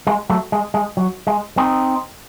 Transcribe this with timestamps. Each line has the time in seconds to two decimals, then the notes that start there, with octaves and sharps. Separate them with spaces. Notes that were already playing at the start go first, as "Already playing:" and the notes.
0.07 G#3
0.30 F#3 A3
0.52 G#3
0.74 G#3
0.97 F#3
1.27 G#3
1.57 C4 D#4